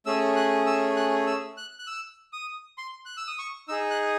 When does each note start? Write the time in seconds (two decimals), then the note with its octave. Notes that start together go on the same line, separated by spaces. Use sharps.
0.06 A3 C#4 G#4 E6
0.36 F#6
0.67 E6
0.97 F#6
1.27 E6
1.57 F#6
1.79 F#6
1.87 E6
2.33 D#6
2.78 C6
3.06 F#6
3.17 E6
3.28 D#6
3.39 C#6
3.68 D#4 G#4 E6
3.91 F#6